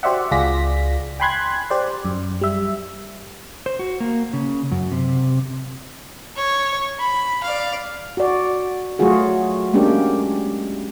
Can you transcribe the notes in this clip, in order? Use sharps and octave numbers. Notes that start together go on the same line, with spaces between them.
F#4 G4 C5 D5 E5 F#5
C#2 F4 G#4 D5 A#6 B6
G5 G#5 B5 C6 F#6 G#6
G4 C5 D5
F#2
G3 E5
C5
F#4
A#3
C#3
F#2
C3
C#5
B5
D5 F5
F#4 D5
F#3 A3 F4 F#4 G#4
G#3 A#3 C#4 D4 G4